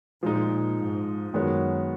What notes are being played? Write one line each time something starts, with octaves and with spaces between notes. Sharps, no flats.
A#2 F3 G#3 D#4
G#2
F#2 D#3 G#3 B3 F#4 C#5